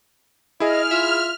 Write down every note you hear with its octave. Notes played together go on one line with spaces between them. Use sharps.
E4 G#4 D#5 F6
F4 E5